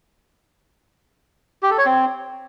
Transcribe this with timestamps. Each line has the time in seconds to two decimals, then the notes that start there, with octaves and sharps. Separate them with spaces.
1.63 G4
1.70 A4
1.78 C#5
1.86 C4